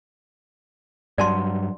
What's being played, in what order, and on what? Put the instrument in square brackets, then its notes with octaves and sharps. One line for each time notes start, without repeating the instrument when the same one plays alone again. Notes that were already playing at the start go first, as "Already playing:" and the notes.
[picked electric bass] G2 F#3 [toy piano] D5 A5 C6